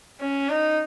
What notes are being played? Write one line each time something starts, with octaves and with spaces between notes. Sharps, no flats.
C#4
D#4